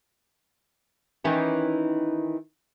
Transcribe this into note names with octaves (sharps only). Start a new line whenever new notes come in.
D#3 E3 C#4